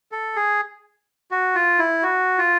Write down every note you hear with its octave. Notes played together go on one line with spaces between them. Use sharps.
A4
G#4
F#4
F4
E4
F#4
F4